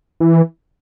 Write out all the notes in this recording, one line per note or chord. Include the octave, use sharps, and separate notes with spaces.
E3